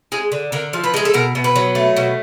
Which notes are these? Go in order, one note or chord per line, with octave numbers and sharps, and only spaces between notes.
G#3 G#4
D3
D3 A#4
F3
B4
G#3 G#4
A4
B2 A#4
B2
B4
F#3
A3
B2